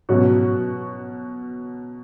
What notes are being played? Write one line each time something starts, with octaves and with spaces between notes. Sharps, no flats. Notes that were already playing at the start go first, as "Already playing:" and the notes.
G#2 B2 F#3 C#4 F#4